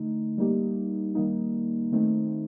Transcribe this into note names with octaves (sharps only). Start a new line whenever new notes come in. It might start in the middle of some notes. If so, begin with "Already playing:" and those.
Already playing: D3 A3 D#4
G3 A#3 D#4 G4
D#3 G3 A#3 D#4
D#3 A3 C4 D#4